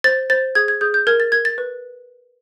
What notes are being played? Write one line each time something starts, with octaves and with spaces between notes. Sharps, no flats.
C5 A6
C5 A6
G#4 G#6
G#6
G#4 G6
G6
A#4 G#6
A6
A#4 G#6
A6
B4